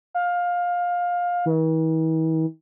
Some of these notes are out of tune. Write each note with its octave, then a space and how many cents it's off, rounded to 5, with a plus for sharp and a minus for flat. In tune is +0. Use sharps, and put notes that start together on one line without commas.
F5 +20
E3 -45